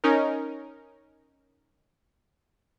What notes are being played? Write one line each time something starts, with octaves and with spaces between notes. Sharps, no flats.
C#4 D#4 A#4